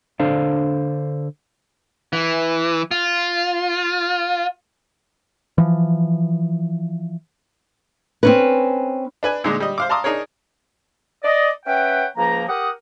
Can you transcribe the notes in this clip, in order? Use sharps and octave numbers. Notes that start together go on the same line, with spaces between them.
D3 D4 A4 C5 F5
E3
F4
E3 F3
C4 C#4 B4
D4 B4 G#5
A#2 D3 G#3 D#4
G3 D#5
C5 F5 D6
F5 A5 A#5 C6 D6 D#6
D4 D#4 G#4 A#4 C#5
D5 D#5
C#4 B4 E5 F#5 G5
C#2 F3 A#3 A#5
G4 A#4 F#5 D#6